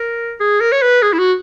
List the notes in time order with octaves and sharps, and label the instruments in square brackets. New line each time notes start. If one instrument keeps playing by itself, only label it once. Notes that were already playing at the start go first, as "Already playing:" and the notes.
Already playing: [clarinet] A#4
G#4
A#4
C#5
B4
G#4
E4
F#4